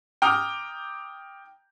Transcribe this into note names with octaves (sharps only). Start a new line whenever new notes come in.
G5 A#5 D6 D#6 F6